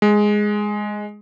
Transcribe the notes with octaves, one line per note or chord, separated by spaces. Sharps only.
G#3